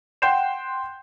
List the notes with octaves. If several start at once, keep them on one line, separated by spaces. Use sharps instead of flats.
F#5 G5 C6 G6 C7 E7